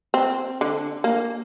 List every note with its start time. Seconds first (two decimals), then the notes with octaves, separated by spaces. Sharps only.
0.14 C4
0.61 D3
1.04 A#3